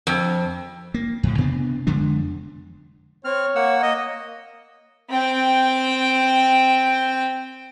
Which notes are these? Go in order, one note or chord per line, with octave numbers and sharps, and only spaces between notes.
F2
A#3
F2 A2
C3 B3 C4 D4
F2 D3 G#3 D4
C4 C#5 F6
A#3 F#5 E6
A#3 D#5
C4 G5